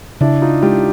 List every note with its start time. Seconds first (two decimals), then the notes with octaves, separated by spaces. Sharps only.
0.21 C#3 D4 E4
0.41 D#4 F4
0.62 G#3 F4 G4